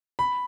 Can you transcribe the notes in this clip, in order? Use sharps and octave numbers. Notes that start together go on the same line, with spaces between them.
B5